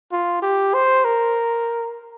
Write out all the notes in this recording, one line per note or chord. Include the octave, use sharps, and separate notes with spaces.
F4
G4
C5
A#4